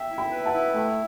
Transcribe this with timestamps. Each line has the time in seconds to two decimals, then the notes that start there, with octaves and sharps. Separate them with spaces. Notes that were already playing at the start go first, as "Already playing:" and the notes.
Already playing: E5 G5
0.10 E4
0.18 G5 B5
0.31 B4
0.45 F#5 A5
0.53 E4
0.74 A3 G5